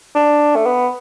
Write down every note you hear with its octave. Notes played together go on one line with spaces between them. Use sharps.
D4
A3
B3